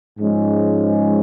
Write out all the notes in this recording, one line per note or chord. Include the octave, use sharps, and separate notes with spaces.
G#2 F3 G#3 C#4